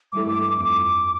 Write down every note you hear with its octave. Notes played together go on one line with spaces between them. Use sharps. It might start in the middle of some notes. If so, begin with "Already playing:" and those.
G2 E3 A3 D6
D6
D6
F2 D6